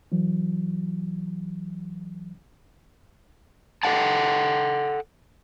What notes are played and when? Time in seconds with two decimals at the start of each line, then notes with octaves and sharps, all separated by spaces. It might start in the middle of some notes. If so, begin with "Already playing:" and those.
0.12 E3 F#3
3.83 A4 B4 D#5 F#5 G5 A5